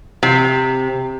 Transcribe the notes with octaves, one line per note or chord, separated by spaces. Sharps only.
C3